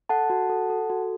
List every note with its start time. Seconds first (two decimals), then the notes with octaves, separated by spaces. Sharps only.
0.09 A4 F#5 A5
0.30 F#4
0.50 A4
0.70 A4
0.90 F#4